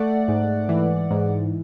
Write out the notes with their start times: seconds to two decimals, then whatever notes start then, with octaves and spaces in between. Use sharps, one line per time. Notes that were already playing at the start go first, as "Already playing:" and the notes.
Already playing: A3 D5 F#5
0.28 G#2
0.69 E3
1.11 G#2